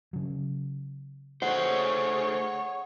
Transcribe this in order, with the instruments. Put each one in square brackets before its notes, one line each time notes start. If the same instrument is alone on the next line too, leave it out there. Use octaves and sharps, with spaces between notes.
[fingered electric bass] C#3 F#3
[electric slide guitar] A3 C5 [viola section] G#4 C#5 [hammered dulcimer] F#5